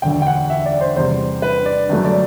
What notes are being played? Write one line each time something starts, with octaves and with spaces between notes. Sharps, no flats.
E1 D2 D3 G5
G5
F#5
E5
D5
C5
E2 C3 G3 C5
B4
D5
G1 F#2 F#3 A3
D5